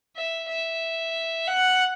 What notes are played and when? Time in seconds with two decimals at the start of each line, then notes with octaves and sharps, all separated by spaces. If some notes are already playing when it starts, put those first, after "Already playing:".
0.16 E5
0.48 E5
1.47 F#5